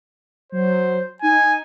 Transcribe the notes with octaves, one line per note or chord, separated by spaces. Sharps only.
F#3 C5
D#4 G#5